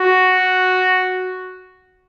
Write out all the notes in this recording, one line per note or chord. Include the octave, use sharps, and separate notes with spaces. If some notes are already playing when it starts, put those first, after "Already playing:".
Already playing: F#4